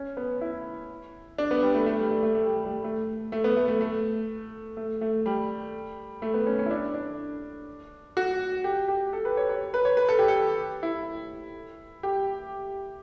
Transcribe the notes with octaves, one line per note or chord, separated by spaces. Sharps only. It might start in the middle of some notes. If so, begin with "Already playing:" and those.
Already playing: C#4
B3
E4
D4
B3
G3
A3
A3
G3
A3
A3
A3
G3
G3
A3
A3
B3
A3
A3
A3
A3
A3
G3
A3
B3
C#4
C#4
E4
D4
D4
F#4
G4
G4
A4
B4
C#5
C#5
B4
C#5
B4
A4
G4
A4
E4
G4